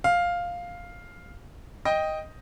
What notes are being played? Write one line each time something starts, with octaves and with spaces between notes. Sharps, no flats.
F5
D#5 G5